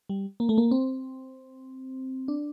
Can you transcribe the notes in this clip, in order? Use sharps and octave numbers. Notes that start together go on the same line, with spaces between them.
G3
A#3
A3
A#3
C4
D4